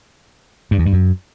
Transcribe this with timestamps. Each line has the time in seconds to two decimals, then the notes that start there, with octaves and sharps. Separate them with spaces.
0.71 G2
0.78 E2
0.86 G2
0.93 F#2